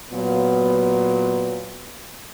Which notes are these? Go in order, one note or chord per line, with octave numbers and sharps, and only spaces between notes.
A#2 F#3 B3